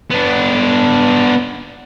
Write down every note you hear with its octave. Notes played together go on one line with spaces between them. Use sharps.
B3 D4